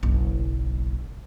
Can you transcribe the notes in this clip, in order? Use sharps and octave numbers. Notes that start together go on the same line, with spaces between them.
F#1 B1